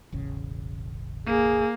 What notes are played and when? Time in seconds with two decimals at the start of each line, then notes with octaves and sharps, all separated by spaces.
0.12 E1 A1 C#3
1.27 A#3 G#4